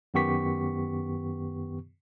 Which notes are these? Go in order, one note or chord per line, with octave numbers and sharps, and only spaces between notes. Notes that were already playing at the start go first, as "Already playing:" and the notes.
F#2 D#3 B3 G4 C#6 B6